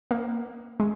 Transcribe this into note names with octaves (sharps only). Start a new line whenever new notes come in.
A#3
G#3